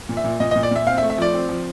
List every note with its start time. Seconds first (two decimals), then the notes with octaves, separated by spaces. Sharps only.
0.09 A#2
0.17 E5
0.25 A#2
0.40 A#2 D#5
0.51 D#5
0.56 A#2
0.63 D5
0.71 A#2 E5
0.87 C4 F5
0.98 E5
1.02 A3
1.10 E5
1.18 F3 D5
1.34 C4
1.49 F3